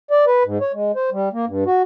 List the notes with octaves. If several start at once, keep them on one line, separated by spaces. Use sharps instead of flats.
D5
B4
G#2
C#5
G#3
C5
G3
A#3
G2
F#4